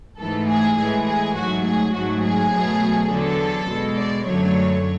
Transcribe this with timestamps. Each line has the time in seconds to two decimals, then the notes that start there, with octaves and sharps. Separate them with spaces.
0.18 G#2 E3 A3 A4
0.48 G#4
0.76 A2 E3 G#3 G#4
1.06 G#4
1.35 G#2 F#3 A3 F#4
1.64 G#4
1.93 G#2 F#3 A3 F#4
2.23 G#4
2.52 B2 F#3 A3
3.09 E2 D3 F#3 A4
3.67 B2 G#3
3.96 D5
4.25 F#2 D3 F#3 A3 C#5